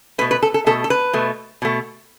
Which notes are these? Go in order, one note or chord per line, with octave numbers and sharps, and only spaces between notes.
B2 A3 B4
B4
A4
A4
B2 A3 A4
A4
B4
B2 A3
B2 A3